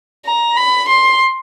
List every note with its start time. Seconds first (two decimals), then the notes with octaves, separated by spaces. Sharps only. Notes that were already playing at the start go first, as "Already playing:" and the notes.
0.25 A#5
0.56 B5
0.88 C6